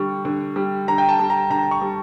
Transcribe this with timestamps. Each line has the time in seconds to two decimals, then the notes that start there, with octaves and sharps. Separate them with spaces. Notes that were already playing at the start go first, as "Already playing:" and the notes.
Already playing: D3 G3 C#6
0.25 D3
0.56 G3
0.88 D3 A#5
0.98 G5
1.09 A5
1.19 G3
1.30 A#5
1.50 D3 A#5
1.71 C#6
1.81 G3